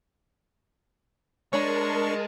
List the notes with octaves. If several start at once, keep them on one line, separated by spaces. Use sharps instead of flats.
G#3 D4 A#4 C#5 D5 A5 B5 C#6